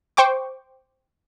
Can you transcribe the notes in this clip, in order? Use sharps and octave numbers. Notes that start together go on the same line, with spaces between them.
C5 G5 C#6 D6